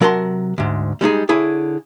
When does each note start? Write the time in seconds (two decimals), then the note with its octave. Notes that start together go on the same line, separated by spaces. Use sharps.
0.01 C3 F#3 A#4 F#5 A5 C6
0.58 D2 G#2
1.01 G3 G#3 D#4 G#4
1.29 D3 E4 G#4 C#5